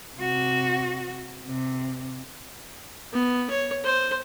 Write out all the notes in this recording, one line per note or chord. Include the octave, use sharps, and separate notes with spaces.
C3 F#4
C3
B3
C#5
C5